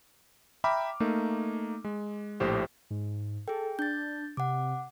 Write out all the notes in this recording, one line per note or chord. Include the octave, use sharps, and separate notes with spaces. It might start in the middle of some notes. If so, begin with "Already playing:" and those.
E5 G5 A#5 B5 D6 F6
A3 A#3 D#4
G#3
A#1 A2 G4 C5
G#2
G#4 A4 G5
D4 G6 A6
C3 F#5 D6